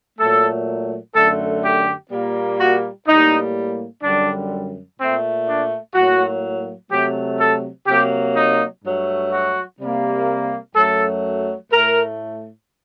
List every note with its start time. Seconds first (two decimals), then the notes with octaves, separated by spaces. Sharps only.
0.19 A#2 F#3 A3 A4
1.15 F#2 D3 A3 A4
1.64 G4
2.12 A#2 G3 A#3
2.59 F#4
3.07 A2 G3 A#3 D#4
4.03 F#2 D3 G3 D4
4.99 A#2 A3 C4
5.48 D4
5.95 A2 F#3 A#3 F#4
6.91 C3 F#3 A3 G4
7.39 A4
7.87 C3 F#3 A#3 G4
8.35 D#4
8.84 G2 F#3 A3
9.32 F#4
9.80 C3 G3 A#3
10.75 F#2 F#3 A3 A4
11.71 A2 A3 A#4